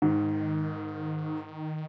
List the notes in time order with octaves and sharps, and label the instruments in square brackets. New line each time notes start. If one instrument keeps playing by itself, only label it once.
[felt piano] G#2 [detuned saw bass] D#3